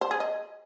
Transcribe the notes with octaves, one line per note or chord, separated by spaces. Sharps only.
C5
G#4
D#5